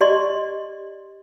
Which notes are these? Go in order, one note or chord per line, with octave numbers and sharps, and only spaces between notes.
G4 D5 D#5 C6